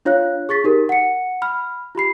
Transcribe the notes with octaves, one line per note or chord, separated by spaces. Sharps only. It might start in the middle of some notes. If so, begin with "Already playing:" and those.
D4 F4 C#5 F5 F#6
G#4 C#6 A6 B6
D#4 G4 A#4
F#5 C#7
B5 F6
F4 G4 B5 C7